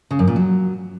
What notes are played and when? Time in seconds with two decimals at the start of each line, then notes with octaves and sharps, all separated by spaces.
0.11 C#3
0.19 F#2
0.27 A#2
0.36 F#3